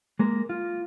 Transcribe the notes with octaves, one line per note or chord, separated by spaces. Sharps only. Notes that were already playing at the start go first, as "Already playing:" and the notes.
G#3 A#3 A#4
F4